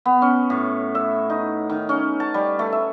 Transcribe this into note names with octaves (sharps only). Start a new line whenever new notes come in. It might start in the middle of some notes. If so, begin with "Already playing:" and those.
B3
C#4
A2
E5
D#4
D#3
C#4
A5
G3
A3
E5